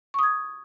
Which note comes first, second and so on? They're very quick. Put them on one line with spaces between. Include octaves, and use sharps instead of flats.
C#6 D#6 G#6